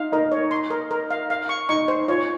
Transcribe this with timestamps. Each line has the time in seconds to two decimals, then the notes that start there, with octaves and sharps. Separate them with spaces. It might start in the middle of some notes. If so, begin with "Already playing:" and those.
Already playing: D#4 F5
0.12 D#4 A#4
0.32 C#5
0.51 C6
0.70 A#4
0.91 A#4
1.10 F5
1.30 F5
1.49 C#6
1.69 D#4 C#6
1.88 C5
2.08 F4 C#5